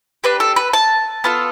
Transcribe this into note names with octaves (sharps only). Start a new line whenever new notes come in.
D4 G4 B4
A4
B4
A5
B3 F4 A4